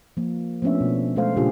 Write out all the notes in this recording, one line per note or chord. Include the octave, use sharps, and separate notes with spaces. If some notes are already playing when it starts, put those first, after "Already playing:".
F3 A#3
F3 A3 B3 C#4 D4 E5
B2
G#3 A3 A4 C5 F5
A#2 C#3 D4 F4 G4 G#4